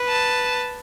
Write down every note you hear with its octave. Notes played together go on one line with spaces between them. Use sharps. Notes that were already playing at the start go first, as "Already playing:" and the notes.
Already playing: B4
A5